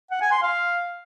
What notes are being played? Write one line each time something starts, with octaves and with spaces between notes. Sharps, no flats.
F#5
G#5
C6
F5